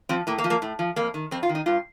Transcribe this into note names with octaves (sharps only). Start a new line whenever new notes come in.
F3 C4
A2 A#3
A#3
F3
A#3
A2
F3
F2 A#3
D#3
F2 C4
F4
D#3
D#4
G2 F4